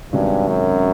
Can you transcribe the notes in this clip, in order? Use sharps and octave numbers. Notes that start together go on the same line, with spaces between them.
G2 C3 D#3 G#3 C#4 F#4
F#2